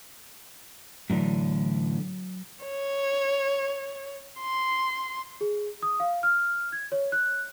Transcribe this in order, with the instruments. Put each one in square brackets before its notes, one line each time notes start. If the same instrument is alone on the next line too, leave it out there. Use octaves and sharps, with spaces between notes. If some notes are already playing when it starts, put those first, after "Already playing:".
[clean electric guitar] A2 D3 E3 [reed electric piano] F#3
[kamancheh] C#5
C6
[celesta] G#4
D#6
F5
F6
G#6
C#5
F#6